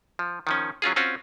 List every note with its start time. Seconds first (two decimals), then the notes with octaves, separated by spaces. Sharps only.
0.19 F3
0.47 D#3 F3 C#4
0.82 F#3 C#4 F4 G#4
0.96 C4 C#4 F4 F#4